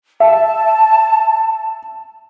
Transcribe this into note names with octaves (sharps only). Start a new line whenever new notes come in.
E5 A5